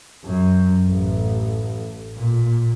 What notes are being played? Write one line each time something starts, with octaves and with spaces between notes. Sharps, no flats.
F#2
A1
A#2